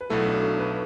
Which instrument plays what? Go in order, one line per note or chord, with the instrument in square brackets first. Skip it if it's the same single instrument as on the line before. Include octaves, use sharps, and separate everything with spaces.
[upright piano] B4
[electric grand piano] B1 B2 F#3 A3 E4 [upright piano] A4
[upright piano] D4
A4
B4